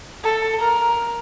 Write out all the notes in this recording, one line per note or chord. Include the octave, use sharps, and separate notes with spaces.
A4
A#4